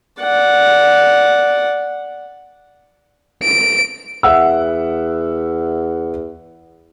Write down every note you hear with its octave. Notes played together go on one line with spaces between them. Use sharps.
D5 F#5
D7
E2 E5 F#5 E6